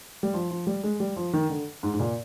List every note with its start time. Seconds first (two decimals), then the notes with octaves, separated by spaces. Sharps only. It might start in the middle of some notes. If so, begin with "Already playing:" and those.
0.23 G3
0.34 F3
0.50 F3
0.67 G3
0.83 G#3
1.00 G3
1.16 F3
1.33 D#3
1.50 D3
1.83 G#2
1.93 G#2
2.00 A#2